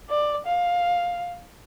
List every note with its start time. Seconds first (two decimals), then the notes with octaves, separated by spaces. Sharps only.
0.10 D5
0.46 F5